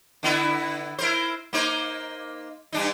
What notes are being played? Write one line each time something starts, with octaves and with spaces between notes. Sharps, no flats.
D3 B3 E4
E4 A#4 C5
A#3 D#4 C5
G2 D4 D#4